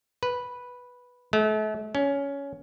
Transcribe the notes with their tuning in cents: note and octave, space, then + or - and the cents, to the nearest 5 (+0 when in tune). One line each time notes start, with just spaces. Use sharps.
B4 -5
A3 -40
C#4 +15